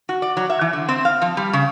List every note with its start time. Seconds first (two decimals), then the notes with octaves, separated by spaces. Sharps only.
0.09 F#4
0.22 D5
0.37 F#3
0.50 E5
0.61 E3
0.73 D3
0.89 C4
1.05 F5
1.22 F3
1.37 G3
1.53 C#3